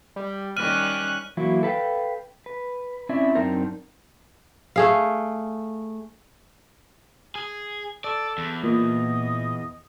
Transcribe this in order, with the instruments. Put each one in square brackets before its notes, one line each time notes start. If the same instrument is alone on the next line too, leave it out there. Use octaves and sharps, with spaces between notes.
[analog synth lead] G3
[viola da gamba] D#3 G3 C#4 [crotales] F6 D#7 [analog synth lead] F#6
[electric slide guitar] E3 F#3 A#3 E4 F#4
A4 B4 F5 G5
B4
C4 C#4 E4 D5 E5
F#2 C4 D4 D#4 A#4 C5
[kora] A3 G#4 F5
[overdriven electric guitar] G#4
[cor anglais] A4 [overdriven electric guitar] D5
[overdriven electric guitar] E2
[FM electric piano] A#2 [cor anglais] D#5